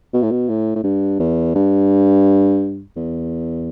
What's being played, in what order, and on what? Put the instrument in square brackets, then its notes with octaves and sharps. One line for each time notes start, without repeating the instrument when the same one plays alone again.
[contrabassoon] B2
A2
B2
A2
A2
G2
E2
G2
E2